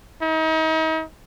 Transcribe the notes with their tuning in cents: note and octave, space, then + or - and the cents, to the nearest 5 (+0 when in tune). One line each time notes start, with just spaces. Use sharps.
D#4 +40